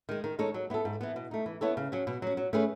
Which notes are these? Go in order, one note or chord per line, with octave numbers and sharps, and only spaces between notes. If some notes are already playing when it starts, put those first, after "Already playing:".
D#3 G#3
D#3
G#3 D#4 A4 C#5
F#3
B3 E4 A4
G#2
E3 B3
B2
A3 D#4
E3
B3 E4 A4 C#5
C#3
F#3 C#4
B2
F#3 C#4
F#3
A3 C#4 G#4 B4